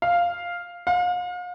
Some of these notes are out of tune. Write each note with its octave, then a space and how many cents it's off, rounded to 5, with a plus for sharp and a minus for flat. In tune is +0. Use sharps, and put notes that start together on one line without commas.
F5 +0
F5 +40